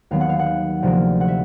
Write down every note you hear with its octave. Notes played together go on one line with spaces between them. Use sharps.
D#2 D#3 F#3 B3 F5
F#5
F5
F#5
D2 C3 F3 A#3
F#5
E5